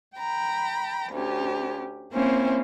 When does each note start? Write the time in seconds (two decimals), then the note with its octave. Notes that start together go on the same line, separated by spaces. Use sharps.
0.16 G5 A#5 B5
1.12 D2 C#4 G4
2.12 A#3 C4 C#4 E4 C5